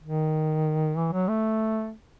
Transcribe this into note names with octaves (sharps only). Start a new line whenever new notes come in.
D#3
E3
F#3
A3